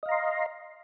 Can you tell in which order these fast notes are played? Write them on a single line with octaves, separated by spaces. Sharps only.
D#5 F5 A#5 C6